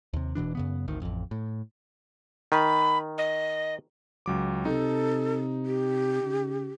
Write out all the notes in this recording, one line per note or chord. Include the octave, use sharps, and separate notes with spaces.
D#2 C3
E1 B2 E3 D4
F#2 C#3 B3
G#1 D2 D#3
A1 F2
A2
D#3 B5
D#5
C#2 F#3 D6
C3 D#4 A4
G4
C#3